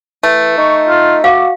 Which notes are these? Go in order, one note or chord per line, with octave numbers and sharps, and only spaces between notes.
E3 A3
D#4 C#6
F4
F#4 F5 D6